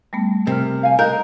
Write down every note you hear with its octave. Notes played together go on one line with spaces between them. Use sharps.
G3 A3 B3
C3 A#4 F6
F5 G#5
D#4 A#4 D#5 F#6 G6